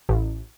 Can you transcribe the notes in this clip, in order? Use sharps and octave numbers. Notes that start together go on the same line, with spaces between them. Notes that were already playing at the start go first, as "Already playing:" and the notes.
A1